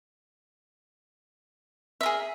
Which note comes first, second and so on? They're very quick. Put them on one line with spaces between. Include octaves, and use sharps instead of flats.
E5 A#4 G#4